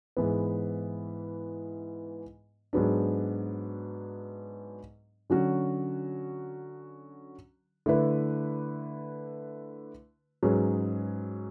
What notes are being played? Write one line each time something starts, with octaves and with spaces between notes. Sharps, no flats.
G#2 E3 B3
G#2 F#3 B3 D4
D3 F#3 C#4 F#4
D3 A3 E4 B4
G#2 F#3 C#4 G#4 B4